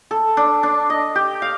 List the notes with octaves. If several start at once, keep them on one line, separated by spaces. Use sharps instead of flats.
A4
D4
D4
D#5
G4
F5